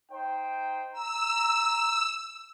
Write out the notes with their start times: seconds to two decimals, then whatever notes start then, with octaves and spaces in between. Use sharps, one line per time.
0.12 D#4 C5 G5
0.93 A#5 E6